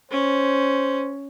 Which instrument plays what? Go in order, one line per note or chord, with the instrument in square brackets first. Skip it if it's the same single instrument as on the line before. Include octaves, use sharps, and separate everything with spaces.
[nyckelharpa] C#4 [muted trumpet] C5